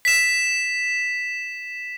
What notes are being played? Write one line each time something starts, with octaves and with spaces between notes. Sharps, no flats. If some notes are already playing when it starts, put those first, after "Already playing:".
B6 E7